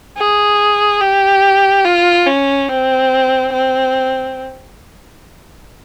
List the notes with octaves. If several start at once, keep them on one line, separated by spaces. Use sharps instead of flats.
G#4
G4
F4
C#4
C4
C4